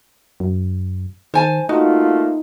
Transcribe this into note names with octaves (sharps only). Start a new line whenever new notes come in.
F#2
D#3 C5 G#5 A5
A3 A#3 D#4 F4 F#4